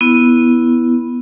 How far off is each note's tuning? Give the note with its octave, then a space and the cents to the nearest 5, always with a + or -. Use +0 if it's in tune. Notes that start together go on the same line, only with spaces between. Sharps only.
B3 +0 E4 +0